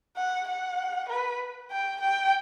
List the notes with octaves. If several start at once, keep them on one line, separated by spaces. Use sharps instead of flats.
F#5
F#5
B4
G5
G5